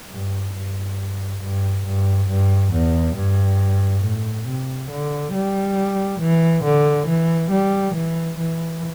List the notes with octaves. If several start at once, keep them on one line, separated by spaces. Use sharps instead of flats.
G2
G2
G2
G2
G2
E2
G2
A2
C3
D3
G3
E3
D3
E3
G3
E3
E3